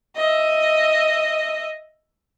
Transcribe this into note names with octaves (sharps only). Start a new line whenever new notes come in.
D#5 E5